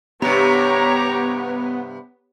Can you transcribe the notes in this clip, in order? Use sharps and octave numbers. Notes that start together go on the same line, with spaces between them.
G2 C3 B3 G4 C#5 A#5